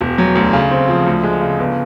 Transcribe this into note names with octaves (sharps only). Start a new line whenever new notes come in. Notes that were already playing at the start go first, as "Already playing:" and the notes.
E1
F#3
D2
C#3
C4
F3
D2
G#3
C#3
G1